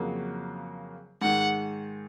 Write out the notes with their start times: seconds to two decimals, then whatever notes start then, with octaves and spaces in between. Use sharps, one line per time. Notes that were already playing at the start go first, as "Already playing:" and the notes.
Already playing: F2 C#3 F#3 A#3
1.22 G#2 D#3 G#3 F#5